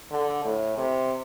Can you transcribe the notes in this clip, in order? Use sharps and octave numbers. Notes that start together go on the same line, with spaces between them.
D3
A2
C3